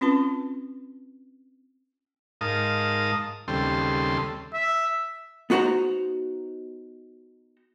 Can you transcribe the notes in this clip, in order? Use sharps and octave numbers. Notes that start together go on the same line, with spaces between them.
C4 C#4 F4 B4 A5 C6
G#2 D#4 A#4 F5 A5 D#6
D#2 C#3 G3 C4 A4 C6
E5
B3 D#4 F#4 C5 A#5